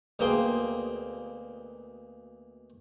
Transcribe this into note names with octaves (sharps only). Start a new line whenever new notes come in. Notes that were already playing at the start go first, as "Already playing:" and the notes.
D2 B2 A#3 G#4 G5 C6